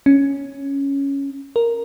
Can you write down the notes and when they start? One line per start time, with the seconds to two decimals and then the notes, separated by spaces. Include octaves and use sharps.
0.06 C#4
1.56 A#4